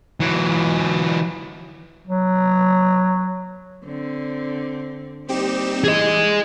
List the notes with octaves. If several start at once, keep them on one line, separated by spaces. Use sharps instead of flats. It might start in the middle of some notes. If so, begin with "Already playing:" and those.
E3 F#3
F#3
D3 C4
G3 A#3 C4 D#4 G4 E7
E3 G#4 D#5